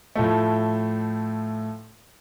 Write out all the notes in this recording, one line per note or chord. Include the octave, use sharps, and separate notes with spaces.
A2 F3 A3